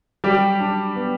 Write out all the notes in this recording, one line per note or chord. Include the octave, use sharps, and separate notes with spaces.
F#3 G3 G4
D4
B3